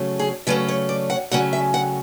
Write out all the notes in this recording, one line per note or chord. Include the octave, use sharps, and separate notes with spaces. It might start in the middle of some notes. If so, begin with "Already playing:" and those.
Already playing: C#3 F#3 A3 C#4
G#4
C#3 F#3 A3 C#4 B4
C#5
D5
F#5
C#3 F#3 A3 C#4 F#5
E5
F#5